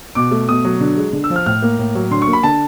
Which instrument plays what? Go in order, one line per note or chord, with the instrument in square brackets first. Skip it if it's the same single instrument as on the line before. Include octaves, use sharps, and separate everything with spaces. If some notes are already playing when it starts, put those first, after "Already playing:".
[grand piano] B2 D6
A3
B2 D#6
F#3
D3
G#3
D3
E6
F3
F6
A2 F6
A#3
A2
F#3
D3 C6
C#6
A#3
B5
D3 A5